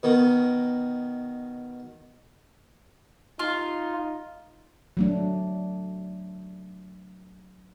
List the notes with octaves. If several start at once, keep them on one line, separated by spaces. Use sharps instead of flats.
B2 D#3
D#4 F4
F#3 A3 D4